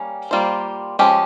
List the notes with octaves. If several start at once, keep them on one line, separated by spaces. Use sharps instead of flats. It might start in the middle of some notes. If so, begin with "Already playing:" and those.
Already playing: G3 A#3 C#4
G3 A#3 F4 C5
F3 G#3 C#4 G4